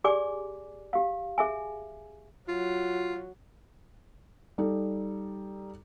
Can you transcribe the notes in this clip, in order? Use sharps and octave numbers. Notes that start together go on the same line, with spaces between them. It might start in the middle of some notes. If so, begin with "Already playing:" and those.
G4 G#4 D5 G#5 D6
G4 F5
G#4 E5 G#5
F#3 F4
G3 D#4 A4